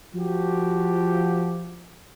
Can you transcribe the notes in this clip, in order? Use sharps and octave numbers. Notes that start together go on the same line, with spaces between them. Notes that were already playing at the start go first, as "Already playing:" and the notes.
F3 F#4 G4